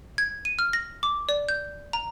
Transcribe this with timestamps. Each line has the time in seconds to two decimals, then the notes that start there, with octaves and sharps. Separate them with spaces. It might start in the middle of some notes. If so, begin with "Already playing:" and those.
0.18 G#6
0.45 D#7
0.59 F6
0.73 A#6
1.03 D6
1.29 D5
1.49 G6
1.93 A#5